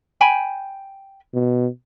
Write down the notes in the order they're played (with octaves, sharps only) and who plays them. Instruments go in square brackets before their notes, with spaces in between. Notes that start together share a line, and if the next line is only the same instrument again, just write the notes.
[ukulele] G5 G#5 B5
[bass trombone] B2